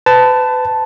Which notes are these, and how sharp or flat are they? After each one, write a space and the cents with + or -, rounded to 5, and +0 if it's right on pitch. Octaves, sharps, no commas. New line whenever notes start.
B4 +35 A5 +0